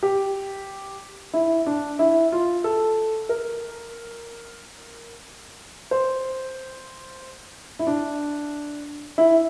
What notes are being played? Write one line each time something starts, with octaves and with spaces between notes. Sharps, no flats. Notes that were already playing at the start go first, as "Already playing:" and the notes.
G4
E4
D4
E4
F4
A4
A#4
C5
E4
D4
E4